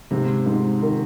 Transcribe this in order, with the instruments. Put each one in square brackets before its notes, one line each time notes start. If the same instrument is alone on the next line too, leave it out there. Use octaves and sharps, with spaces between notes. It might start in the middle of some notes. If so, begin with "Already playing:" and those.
[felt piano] G#2 [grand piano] C3
[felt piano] G#2
D#3